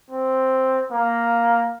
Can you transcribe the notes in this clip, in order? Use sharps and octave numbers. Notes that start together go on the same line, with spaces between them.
C4
A#3